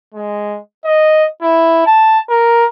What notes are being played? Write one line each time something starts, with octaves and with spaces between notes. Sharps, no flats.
G#3
D#5
E4
A5
A#4